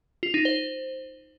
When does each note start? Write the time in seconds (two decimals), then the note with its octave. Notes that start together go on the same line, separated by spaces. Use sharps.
0.23 F4
0.34 D#4
0.45 C5